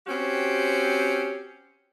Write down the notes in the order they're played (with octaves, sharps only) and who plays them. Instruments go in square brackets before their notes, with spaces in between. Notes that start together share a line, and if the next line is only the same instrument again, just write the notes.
[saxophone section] C4 C#4 F#4 G4